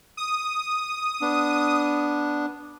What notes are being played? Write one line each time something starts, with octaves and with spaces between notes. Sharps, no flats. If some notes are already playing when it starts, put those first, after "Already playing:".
D#6
B3 D4